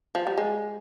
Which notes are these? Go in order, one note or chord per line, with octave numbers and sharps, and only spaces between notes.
F3
G3
G#3